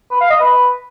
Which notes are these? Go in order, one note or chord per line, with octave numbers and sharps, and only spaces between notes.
B4
F5
D#5
B4